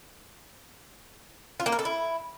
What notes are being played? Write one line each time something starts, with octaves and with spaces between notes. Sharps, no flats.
F4
A#3
A#4
A4
E4